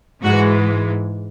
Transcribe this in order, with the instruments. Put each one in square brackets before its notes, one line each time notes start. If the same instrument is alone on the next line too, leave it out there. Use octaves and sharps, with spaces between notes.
[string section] G#2 E3 G#3 F#4